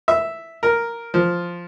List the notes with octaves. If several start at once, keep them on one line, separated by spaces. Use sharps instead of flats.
E5
A#4
F3